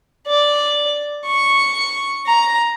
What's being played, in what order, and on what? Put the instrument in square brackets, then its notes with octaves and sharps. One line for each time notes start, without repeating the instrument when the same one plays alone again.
[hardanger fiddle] D5
C#6
A#5